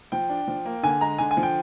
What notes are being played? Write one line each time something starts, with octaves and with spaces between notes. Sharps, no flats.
F3 G5
D4
F3
A#3
D3 G#5
G#3 A#5
D3 G#5
G#5
F3
G5